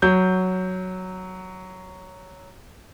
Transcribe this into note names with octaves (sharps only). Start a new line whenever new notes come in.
F#3 G6